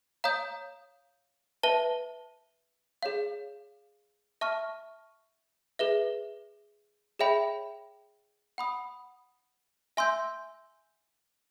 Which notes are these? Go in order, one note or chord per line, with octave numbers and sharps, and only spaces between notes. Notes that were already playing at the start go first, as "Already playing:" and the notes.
C#5 F5 A#5 D#6 G6
B4 E5 A5
G#4 C#5 F5
E5 A5 C#6 F6
G#4 B4 E5
G#4 C#5 E5 G5 B5
F#5 B5 D#6
E5 G#5 C6 E6 G6